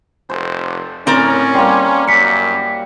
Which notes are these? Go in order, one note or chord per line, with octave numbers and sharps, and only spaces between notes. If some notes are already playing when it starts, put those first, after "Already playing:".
F1 A4 C5
A2 C4 C#4 A#4 D5
G3 A#3 G5 C6
F#2 B6 C#7